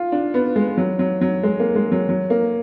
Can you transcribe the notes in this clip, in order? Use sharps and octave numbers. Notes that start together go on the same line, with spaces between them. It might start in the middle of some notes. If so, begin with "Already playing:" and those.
Already playing: F4
D4
B3
G#3
F#3
F#3
F#3
G#3
A#3
G#3
F#3
F#3
A#3